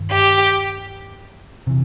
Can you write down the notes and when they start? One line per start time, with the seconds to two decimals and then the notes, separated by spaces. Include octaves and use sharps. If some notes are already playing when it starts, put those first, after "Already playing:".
Already playing: G2 D#3
0.11 G4
1.67 C3 E3